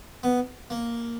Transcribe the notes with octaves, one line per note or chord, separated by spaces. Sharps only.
B3
A#3